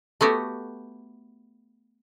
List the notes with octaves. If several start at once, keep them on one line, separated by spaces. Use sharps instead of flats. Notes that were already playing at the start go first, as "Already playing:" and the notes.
A3 B3 F#4 G4